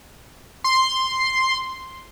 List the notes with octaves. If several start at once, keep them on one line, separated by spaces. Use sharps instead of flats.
C6